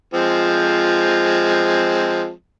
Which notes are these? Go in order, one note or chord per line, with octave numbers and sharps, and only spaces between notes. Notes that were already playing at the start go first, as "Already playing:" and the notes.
F3 G#3 C4